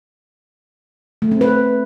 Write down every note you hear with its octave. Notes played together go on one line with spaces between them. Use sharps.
A3
C4
B4